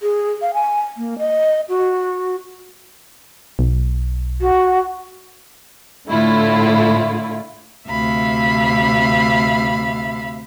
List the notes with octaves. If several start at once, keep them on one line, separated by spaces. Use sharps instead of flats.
G#4
F5
G#5
A#3
D#5
F#4
B1
F#4
A2 D3 A3 E4 F4
D2 C3 E5 F5 B5